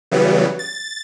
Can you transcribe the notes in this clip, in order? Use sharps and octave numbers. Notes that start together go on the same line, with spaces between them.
C#3 E3 F#3 G3 B3
A6